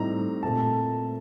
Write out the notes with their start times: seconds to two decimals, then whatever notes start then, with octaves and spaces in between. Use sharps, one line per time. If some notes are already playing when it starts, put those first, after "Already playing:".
Already playing: A2 G3 C4 D#4 A#5
0.43 A#2 A3 C4 A5